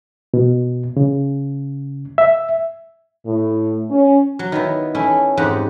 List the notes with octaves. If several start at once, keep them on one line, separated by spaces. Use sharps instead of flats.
B2
C#3
E5
A2
C#4
F#3
D#3 B3 E4
A3 C#4 E4
F2 G#2 G4 D#5 F#5